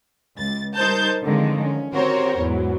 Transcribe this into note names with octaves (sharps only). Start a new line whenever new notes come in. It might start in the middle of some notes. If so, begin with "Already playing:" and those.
C#2 A6
G3 D#4 A#4 C5 A5 G6
D3 D#3 F3 G#3 C4
C#4
C4 F#4 G4 A#4 C5 C#5
E2 G#2 F#3